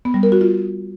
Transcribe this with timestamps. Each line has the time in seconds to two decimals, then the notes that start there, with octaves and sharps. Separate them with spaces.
0.05 B3
0.14 G3
0.23 A#4
0.32 F#4
0.41 F4